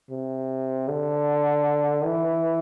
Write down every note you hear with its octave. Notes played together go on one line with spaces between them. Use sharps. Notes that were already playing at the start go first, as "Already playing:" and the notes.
C3
D3
E3